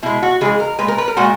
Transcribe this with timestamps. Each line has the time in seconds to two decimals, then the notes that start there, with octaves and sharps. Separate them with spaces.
0.03 B2 G#3 E4
0.23 F#4
0.41 C#3 E3 G#3 G#4
0.60 A#4
0.79 A#2 G#3 B4
0.88 A#4
0.98 B4
1.08 A#4
1.17 A#2 G#3 F#4